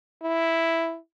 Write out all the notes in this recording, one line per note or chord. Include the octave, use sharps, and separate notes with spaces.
E4